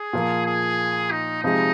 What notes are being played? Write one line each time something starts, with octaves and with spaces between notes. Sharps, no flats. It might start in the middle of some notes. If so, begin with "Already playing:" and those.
Already playing: G#4
A#2 F3 A#3
G#4
D#4
C3 F3 G#3 D#4